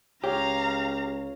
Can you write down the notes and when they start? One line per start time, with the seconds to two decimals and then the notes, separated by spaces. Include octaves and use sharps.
0.24 C#2 G4 C#5 F5 A#5